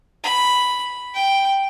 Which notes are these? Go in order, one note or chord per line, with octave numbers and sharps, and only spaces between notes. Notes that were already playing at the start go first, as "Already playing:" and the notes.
B5
G5